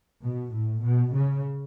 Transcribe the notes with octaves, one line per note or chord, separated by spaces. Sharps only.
B2
A2
B2
C#3